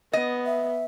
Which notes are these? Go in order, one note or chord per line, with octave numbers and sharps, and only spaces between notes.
B3 D#5
E5